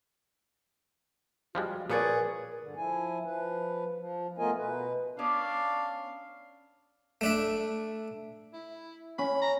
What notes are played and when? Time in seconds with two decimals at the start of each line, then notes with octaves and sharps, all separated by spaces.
1.55 F3 G3 G#3 F#4
1.90 A#2 F3 G#4 A#4 B4 C#5 D5
2.60 G2 D3
2.77 F3 E4 G#5
3.25 F3 B4
3.98 F3
4.38 A3 B3 F4 A#4 D#5 G#5
4.57 B2 B4
5.19 B3 C#4 D4 D5 F5
7.21 A3 D4 E5
8.54 E4
9.19 C#4 B5
9.42 A#5